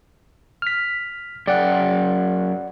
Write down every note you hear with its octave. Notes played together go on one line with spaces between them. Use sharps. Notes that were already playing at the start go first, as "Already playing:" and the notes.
F6 B6
F#2 G#4 D5 F#5 G5